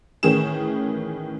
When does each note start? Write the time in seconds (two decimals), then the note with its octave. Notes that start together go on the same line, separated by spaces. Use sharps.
0.23 A2 D#3 E3 C#4 G#4 E7